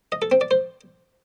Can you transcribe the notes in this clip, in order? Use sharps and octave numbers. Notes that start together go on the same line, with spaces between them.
D#5
A4
C4
D5
C5